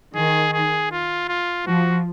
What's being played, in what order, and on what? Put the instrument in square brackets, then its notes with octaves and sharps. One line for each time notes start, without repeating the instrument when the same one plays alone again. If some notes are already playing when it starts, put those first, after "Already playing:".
[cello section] D#3 [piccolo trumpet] G#4
[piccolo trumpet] G#4
F4
F4
[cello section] F3 [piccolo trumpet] F#4